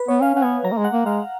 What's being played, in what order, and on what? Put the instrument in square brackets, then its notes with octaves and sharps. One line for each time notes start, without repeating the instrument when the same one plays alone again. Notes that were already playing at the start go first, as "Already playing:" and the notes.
Already playing: [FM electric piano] B4
[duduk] B3 [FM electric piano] C#5
[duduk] C#4 [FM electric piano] F5
[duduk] C#4 [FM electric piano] F#5
[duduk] B3 [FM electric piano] G#5
[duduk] F#3 [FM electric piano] A#5
[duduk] A#3
G#3
[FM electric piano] F#5
[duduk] A#3
[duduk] G#3 [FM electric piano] F5